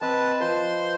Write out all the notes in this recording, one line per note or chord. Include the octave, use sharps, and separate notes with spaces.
C4 B4 D#5 A5
F3 B4 C5 C6